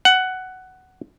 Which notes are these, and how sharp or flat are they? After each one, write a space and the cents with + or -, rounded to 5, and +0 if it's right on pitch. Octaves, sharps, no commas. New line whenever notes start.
F#5 +10